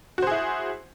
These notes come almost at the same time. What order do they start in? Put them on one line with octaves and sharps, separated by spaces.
F#4 C5 G#4 E4